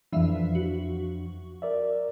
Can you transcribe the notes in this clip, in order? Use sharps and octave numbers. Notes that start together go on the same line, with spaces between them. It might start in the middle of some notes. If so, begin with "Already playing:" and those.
F2 E3 F3 D4 E5 F5
F#4
A#4 D5 E5